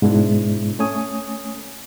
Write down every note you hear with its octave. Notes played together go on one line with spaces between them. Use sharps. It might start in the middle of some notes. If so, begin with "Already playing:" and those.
G#2 B2 G#3 D4 E4
A3 C#4 C#5 G#5 D#6